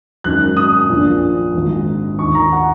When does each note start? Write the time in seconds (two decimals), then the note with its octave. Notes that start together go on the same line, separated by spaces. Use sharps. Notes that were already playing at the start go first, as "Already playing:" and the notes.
0.24 G#1 F#2 D#3 F#6
0.57 D#6
0.89 A#1 A#2
1.54 G#1 G#2 D#3
2.19 D#2 D#3 C#6
2.35 A#5
2.52 F#5